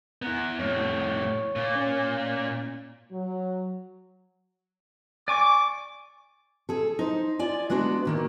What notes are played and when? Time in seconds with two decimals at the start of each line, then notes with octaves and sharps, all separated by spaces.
0.22 B3 E4 A#5
0.59 F2 A2 C#5
1.56 A#2
1.75 C#4
3.11 F#3
5.28 D5 G#5 C#6 D6
6.69 G#4 A4
6.99 D#4 C5
7.39 F4 D5 G#5
7.70 G#3 B3 D4 F#4
8.05 A#2 D#3 A#3